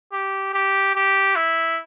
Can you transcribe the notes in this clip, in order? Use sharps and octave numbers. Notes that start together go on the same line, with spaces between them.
G4
G4
G4
E4